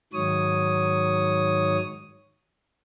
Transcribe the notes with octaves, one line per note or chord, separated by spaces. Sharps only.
G#2 D#3 F#3 C#5 D#6